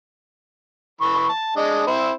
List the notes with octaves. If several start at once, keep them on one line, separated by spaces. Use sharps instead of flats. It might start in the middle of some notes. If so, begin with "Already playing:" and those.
E3 B5 C#6
A5
G#3 D4 D#5
C4 E4